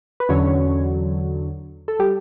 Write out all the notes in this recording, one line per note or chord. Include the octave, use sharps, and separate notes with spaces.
B4
E2 D3 F#3 C#4 C#5
A4
G3 G4